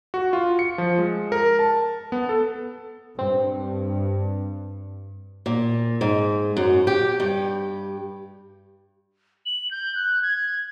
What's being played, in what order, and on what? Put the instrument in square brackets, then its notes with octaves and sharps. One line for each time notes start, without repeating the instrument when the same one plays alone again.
[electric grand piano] F#4
F4
C#7
F3
G#3
A#4
A5
B3
A4
[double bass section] G2 [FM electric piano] C4
[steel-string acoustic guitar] A#2
G#2
F#2
G4
G2
[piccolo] F#7
G6
F#6
G#6